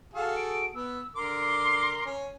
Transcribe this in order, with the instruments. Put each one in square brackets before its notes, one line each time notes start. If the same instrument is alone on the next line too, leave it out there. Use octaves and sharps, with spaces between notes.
[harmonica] F#4 G#4 A4 [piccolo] F5
[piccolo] D7
[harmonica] B3 [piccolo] E6
[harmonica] D3 A#4 D6 [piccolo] C6
[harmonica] C#4